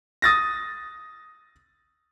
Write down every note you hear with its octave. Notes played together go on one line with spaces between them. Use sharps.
D#6 A6 A#6